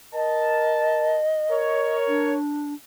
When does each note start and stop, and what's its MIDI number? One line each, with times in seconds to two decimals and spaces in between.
0.14 1.18 70
0.14 1.97 75
0.14 1.18 81
1.50 2.36 70
1.50 2.36 73
2.08 2.74 62